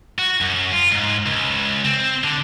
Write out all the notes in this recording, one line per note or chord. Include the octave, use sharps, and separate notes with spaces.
F#4
F#2
F4
G#2
C#2
C4
D3